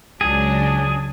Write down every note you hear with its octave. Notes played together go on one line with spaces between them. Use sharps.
C#2 F#3 D4 G#4